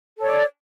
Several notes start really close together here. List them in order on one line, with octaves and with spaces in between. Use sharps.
A4 C#5 D5